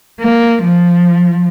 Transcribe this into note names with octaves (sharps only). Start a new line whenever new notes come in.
A#3
F3